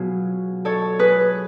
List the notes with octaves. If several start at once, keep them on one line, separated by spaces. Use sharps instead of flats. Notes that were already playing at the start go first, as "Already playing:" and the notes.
Already playing: B2 F#3 F4 G#4
A4 C#5
G#4 B4